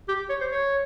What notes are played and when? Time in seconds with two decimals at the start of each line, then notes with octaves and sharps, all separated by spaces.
0.08 G4
0.29 C#5
0.41 C5
0.51 C#5